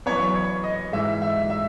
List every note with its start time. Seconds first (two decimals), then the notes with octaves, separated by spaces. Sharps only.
0.06 F#2 E3 B3 C#5
0.35 C#5
0.64 D#5
0.92 G#2 E3 G#3 E5
1.22 E5
1.50 E5